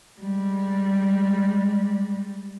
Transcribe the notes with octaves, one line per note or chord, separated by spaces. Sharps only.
G3 G#3